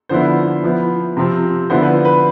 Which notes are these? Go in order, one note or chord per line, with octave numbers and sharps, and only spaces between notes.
D3 F3 B3 E4 C5
F3 B3 E4
C3 F3 C4
D3 F3 B3 E4 C5
B4
B4